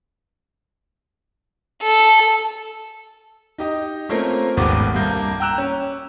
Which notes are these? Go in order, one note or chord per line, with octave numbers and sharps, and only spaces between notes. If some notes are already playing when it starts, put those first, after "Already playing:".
A4
D#4 G4 D#5
A3 A#3 C4 C#4 F4 A#4
D#1 G#1 D#2 A3 B3 D6
C2 G2 A#3 G6
G5 A#5 E6 F#6 E7
C#4